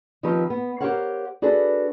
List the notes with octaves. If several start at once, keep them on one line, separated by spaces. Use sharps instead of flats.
D#3 F3 C4 G4 B4 C#5
B3
G4 A#4 C5 C#5 F5 F#5
D4 F#4 G#4 A4 B4